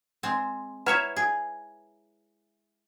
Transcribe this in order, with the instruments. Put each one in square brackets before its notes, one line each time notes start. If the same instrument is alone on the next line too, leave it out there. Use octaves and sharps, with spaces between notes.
[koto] G#3 C4
[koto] E4 C#5 E5 [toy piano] B4 F#5 A#5
[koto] G#4